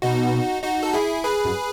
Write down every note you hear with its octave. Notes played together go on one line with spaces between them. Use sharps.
B2 D#4 F#4
D#4 F#4
A4
E4 G#4
G#4 B4
F#2